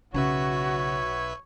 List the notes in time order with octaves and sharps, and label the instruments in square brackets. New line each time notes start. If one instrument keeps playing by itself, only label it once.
[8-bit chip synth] B1 B4 E5 [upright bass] C#3 [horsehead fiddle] F#4 [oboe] C#5